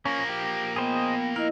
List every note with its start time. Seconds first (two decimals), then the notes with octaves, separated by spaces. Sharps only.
0.05 F3 A#3 C#4
0.29 G4
0.76 B3 G#4 C5 D#5 G5
1.36 E4 A#4 D#5